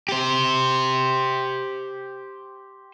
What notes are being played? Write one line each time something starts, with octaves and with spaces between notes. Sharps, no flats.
G4 C5